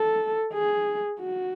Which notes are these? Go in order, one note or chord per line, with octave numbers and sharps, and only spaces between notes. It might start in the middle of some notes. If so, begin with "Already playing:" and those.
Already playing: A4
G#4
F#4